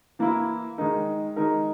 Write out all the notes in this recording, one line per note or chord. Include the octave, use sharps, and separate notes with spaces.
E3 A#3 E4
D#3 G#3 D#4 A#4
D#3 G#3 D#4 A#4